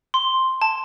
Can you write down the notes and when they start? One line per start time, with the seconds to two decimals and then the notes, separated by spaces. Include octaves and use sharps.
0.14 C6
0.62 A5